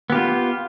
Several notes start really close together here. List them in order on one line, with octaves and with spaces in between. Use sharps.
B3 G4 F4